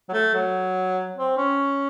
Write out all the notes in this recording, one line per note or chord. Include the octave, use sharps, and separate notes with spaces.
F#3
A3
F#3
C4
C#4